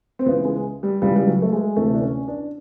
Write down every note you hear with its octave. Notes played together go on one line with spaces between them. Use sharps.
C4
C#2 C#3 E3 B3
G#3
G3
C#2 C#3 E3 G3
G3
F#3
A3
G#3
D2 C3 E3 A3
D4
C#4
D4